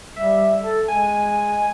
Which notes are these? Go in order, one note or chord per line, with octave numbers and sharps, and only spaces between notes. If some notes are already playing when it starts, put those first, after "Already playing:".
G3 E5
A4
G#3 G#5